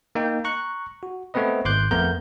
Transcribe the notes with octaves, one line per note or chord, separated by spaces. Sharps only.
A#3 D#4 G5
A#5 C#6 F#6
F#4
A3 B3 C4 B4 D#5
G#1 C6 D6 F#6 G6
F2 A3 B3 A#4 A#5 G6